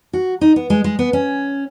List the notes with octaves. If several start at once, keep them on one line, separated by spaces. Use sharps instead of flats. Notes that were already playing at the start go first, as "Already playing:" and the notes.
F#4
D#4
B3
G#3
G#3
B3
C#4